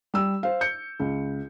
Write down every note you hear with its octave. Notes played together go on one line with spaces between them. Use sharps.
G3 E6
C5 F5
G6 C#7
C#2